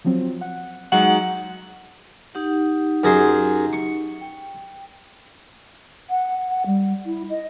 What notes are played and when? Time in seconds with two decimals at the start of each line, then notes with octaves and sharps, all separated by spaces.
0.05 F3 F#3 C4
0.41 F#5
0.92 F#3 G#3 D#4 F#5
2.35 D#4 G4 F#5
3.04 F#2 G#4 C5
3.73 C#6
4.21 G5
6.10 F#5
6.48 F#5
6.66 G3
7.06 E4
7.30 D#5